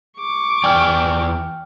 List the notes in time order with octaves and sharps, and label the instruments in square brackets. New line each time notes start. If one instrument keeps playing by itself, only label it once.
[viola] C#6 D6
[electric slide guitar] E2 D5 G#5 [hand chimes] G5 F6